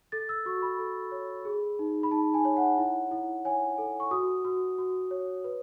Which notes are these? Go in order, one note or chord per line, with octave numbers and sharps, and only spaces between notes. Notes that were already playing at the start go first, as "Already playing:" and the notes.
A4 A6
E6
F#4 C#6
B5
A4
C#5
G#4
D#4
B5
D#4 A5
G#5
C#5
F#5
E4
E4
C#5 G#5
A4
C#6
F#4 D#6
F#4
F#4
C#5
B4